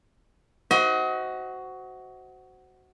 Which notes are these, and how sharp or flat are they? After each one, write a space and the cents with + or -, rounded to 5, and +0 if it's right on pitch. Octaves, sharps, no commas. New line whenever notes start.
F#4 +10 C5 -10 D#5 +35